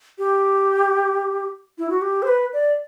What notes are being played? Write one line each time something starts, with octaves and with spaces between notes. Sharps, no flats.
G4
E4
F#4
G4
C5
B4
D5